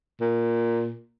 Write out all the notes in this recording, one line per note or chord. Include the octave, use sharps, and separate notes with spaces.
A#2